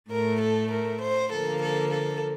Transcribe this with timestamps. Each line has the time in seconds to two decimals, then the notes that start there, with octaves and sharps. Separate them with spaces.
0.11 A2 A3 A#4
0.41 A4
0.72 A#4
1.02 C5
1.32 D3 F3 A#3 A4
1.62 A4
1.92 A4